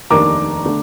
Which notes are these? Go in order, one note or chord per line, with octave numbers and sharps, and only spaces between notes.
F1 D#2 D#3 A#3 D4 A#5 D6
D3 A3